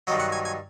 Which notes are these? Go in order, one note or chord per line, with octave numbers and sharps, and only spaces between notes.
G2 D#3 F#3 D#5
F#5
G#5
G#5